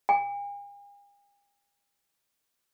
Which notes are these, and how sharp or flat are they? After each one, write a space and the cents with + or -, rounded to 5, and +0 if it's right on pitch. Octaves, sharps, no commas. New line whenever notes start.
G#5 -45